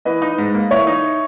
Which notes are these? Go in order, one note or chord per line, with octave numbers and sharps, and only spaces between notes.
E3 B4 D#5
D#4
G#2
A#3
E3 C#5 E5
D#4